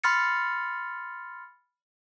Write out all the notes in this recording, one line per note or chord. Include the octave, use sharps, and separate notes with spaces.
B5 C6 F6 A6 C#7